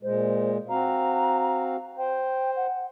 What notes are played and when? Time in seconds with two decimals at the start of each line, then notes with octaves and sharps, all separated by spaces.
0.03 A#2 G#3 C5
0.69 C4 F#4 F5 A#5
1.98 C5 G5
2.56 F#5